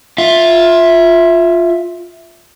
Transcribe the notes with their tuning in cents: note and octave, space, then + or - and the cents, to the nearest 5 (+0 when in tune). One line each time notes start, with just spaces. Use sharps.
F4 +5 E5 +0